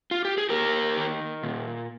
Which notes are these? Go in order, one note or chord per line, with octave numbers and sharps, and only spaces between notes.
F4
G4
G#4
A#3 G4 A#4
D#3
A#2